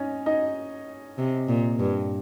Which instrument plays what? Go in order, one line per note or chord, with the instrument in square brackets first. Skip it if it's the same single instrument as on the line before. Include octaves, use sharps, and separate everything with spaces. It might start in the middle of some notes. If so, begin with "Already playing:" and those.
Already playing: [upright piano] C#4 D#4 C#5 D#5
D#4 D#5
[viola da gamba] C3
A#2
G2